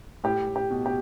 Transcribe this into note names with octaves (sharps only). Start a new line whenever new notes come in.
A2 G4
A2
G4
B2
G4